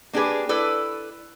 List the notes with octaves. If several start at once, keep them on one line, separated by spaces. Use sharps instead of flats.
A#3 D4 G4 G#4 B4
E4 A4 B4 D5